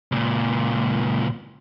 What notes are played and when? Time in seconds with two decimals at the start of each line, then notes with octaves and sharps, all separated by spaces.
0.12 C#2 A#2